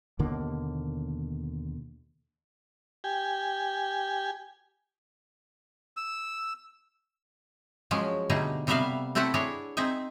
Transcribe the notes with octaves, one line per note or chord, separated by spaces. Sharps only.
D#2 B2 D3 A#3
G4 G#5
E6
F3 F#3 G#3 C#4
B2 D3 G3 A3 D#4 G#4
C3 G3 A3 B3 E5 F5
A3 C4 E4 A4 B4 F#5
D4 E4 G#4 C#5
C4 D#4 G#4 E5